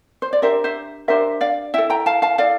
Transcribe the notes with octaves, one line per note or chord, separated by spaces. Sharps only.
C5
D5
D4 G4 A#4 C5 E5
C5 E5
D4 G4 A#4 C5 E5
D5 F5
E4 A4 E5 G5
G5 A#5
F5 A5
F5 A5
E4 A4 D5 F5